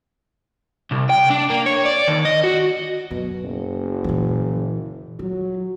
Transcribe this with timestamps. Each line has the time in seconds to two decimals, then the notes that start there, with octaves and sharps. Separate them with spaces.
0.91 C2
1.09 G5
1.30 D4
1.50 A#3
1.66 C#5
1.86 D5
2.08 D#2
2.25 D#5
2.44 F#4
3.11 F#2 B2
3.43 F#1
4.04 A#2 E3
5.19 F#3 F4